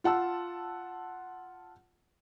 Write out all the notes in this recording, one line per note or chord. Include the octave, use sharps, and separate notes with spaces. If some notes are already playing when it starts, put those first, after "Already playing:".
F4 F#5 A5 E6